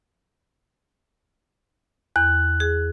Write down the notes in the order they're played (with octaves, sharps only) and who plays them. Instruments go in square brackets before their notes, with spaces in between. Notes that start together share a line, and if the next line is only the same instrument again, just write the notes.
[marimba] E2 [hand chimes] F#6
[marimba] G#4